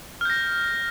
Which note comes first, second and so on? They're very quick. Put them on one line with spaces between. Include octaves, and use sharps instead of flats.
F6 G6 A#6